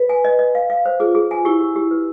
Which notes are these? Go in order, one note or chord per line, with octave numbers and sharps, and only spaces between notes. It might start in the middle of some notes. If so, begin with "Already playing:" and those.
Already playing: B4
G#5
D#5
D#5
F5
F5
C5
F4 G#4
G#4
G#5
E4 G4
G4
G4
B4